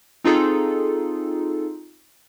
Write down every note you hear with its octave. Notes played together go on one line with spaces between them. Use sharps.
C4 D#4 F4 G#4 A4